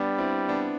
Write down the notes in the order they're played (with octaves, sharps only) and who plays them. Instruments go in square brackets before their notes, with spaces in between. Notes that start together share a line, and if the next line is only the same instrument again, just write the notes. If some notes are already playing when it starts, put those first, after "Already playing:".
Already playing: [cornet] G3 [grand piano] B3 D4
[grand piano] C4 E4
B3 D4